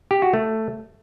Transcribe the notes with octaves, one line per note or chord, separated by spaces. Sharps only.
G4
F#4
A3